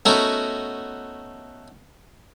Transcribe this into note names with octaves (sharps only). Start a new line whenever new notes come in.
A3 B3 C#4 D#4 F#4 A#4